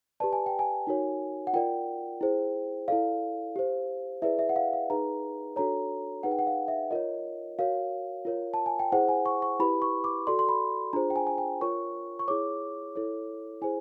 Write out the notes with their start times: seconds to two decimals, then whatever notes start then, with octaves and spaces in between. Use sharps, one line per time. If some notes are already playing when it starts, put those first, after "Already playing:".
0.20 G4 B4 D5 A5
0.33 G#5
0.46 G5
0.59 G#5
0.87 D#4 F#4 A#4 C#5
1.47 F#5
1.53 F4 A#4 D5 G5
2.21 E4 G#4 C5
2.88 E4 A4 D5 F5
3.56 G4 C5
4.22 E4 G#4 B4 D5 E5
4.39 E5
4.49 F#5
4.56 F5
4.73 F5
4.90 D#4 G#4 B4 A#5
5.56 D4 F#4 A4 C#5 A#5
6.23 D#4 G#4 B4 F#5
6.32 G5
6.39 F#5
6.47 F5
6.68 E5
6.91 F4 A#4 C#5 D#5
7.59 F#4 A#4 C#5 F5
8.25 F4 A#4 C#5
8.54 A5
8.66 G#5
8.79 G5
8.92 E4 G#4 C5 F#5
9.09 G#5
9.26 C#6
9.42 C#6
9.60 E4 G4 B4 B5
9.82 C#6
10.04 D6
10.27 F#4 A4 D5 C6
10.39 C6
10.49 B5
10.93 D4 F4 G#4 C5 A#5
11.10 G5
11.16 G#5
11.27 G#5
11.38 G5
11.61 F4 A#4 C#5 C#6
12.19 C#6
12.28 E4 G#4 C#5 D6
12.96 E4 A4 C#5
13.62 E4 G#4 C5 G#5